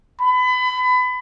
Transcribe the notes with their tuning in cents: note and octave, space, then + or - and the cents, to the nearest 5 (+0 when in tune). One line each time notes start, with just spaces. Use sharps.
B5 +30